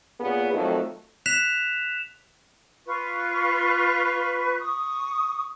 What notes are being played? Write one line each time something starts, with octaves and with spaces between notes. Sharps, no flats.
A#2 B3 C#4 G#4
F2 D#3 F#3 A3 D#4
F#6 B6 E7 F7
F4 B4 C#6
C#6 D#6